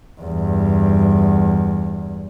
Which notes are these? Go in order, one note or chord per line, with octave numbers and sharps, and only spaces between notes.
E2 G2